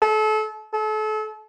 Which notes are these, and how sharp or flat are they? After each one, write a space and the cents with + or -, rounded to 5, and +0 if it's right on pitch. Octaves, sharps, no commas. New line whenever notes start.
A4 -35
A4 -35